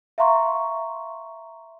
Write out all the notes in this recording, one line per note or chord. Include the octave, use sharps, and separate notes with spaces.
E5 F5 A#5 C6 C#6